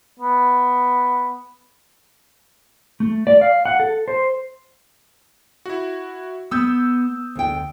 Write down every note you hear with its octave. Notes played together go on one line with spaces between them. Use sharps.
B3
A3
D5
F5
F#5
A4
C5
E4 F#4
B3 D#6 E6 G6
D2 G5